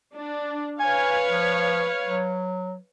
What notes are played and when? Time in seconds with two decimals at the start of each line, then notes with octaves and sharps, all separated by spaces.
0.14 D4
0.80 B4 C#5 F5 G#5
1.30 F3
2.06 F#3